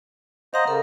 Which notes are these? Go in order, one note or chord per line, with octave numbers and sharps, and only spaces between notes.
C5 D#5 F5 F#5 A#5
C#3 A4 A#4